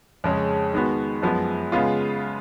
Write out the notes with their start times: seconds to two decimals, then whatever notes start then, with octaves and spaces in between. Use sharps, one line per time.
0.24 F2 C#3 G#3 C#4
0.73 D#3 G#3 B3 F#4
1.22 F#2 F3 G#3 B3
1.72 C#3 G#3 B3 F4